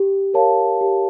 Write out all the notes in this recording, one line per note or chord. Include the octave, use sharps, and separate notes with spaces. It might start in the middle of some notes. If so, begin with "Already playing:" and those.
Already playing: G4
A#4 C#5 F5 A5
G4